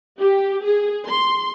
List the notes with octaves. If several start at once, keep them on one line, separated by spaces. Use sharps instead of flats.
G4
G#4
C6